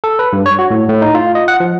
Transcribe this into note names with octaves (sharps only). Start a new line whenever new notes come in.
A4
B4
G2
C#5
F#4
A2
A2
D#4
F4
D#5
F#5
F3